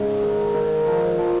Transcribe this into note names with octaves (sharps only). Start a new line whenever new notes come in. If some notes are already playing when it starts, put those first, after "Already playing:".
Already playing: G#2 C#3
D#3
D#3
F3
F3